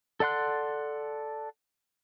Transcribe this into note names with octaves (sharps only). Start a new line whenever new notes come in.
A4 D5 F#5 C6 F#6